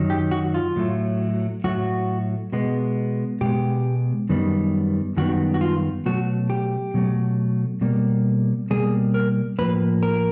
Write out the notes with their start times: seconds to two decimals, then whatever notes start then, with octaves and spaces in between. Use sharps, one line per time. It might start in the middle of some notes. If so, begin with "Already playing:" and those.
Already playing: F#2 D#3 F#3
0.10 G4
0.31 F#4
0.54 F4
0.76 A2 F#3 A3
1.64 A2 F#3 A3 F#4
2.52 B2 G#3 B3
3.41 B2 G#3 B3 G4
4.29 F#2 D#3 G3 B3
5.17 F#2 D#3 G3 B3 F#4
5.54 F#4
5.61 F4
6.06 B2 F#3 A3 F#4
6.50 G4
6.94 B2 F#3 A3
7.81 B2 G3 A#3
8.70 B2 G3 A#3 G#4
9.14 A#4
9.59 A2 F3 A#3 B4
10.03 A#4